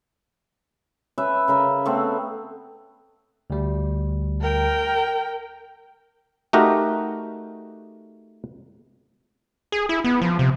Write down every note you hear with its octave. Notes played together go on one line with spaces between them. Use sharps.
C#4 B4 E5
C#3 A#4 B5
A3 B3 C4
D2 G3
A#4 G5
A3 D#4 F#4 G4 A#4
G#4
E4
B3
F3
C3